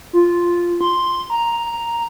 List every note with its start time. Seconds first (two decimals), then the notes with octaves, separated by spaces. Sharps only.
0.13 F4
0.81 C6
1.30 A#5